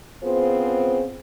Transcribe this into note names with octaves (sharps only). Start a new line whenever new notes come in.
C#3 B3 C4 F4 G#4 C5